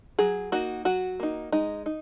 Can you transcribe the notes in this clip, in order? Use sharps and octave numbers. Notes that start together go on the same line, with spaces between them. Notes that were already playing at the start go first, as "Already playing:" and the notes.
F#3 G#4
A#3 D#4 F#4
F#3 F#4
A#3 D#4
G#3 D#4
D#4